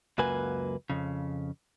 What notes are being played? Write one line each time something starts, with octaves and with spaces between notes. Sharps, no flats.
C#2 F#2 F#3 A#3 B4 G#5
F2 C#3